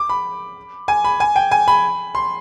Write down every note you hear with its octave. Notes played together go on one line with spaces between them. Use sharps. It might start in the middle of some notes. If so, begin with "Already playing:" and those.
Already playing: D6
B5
G#5
B5
G#5
G5
G#5
B5
C6